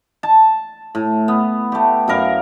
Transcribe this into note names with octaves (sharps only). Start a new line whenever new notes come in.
A5
A2
B3
A3 G4
F#2 E4 A#4 F5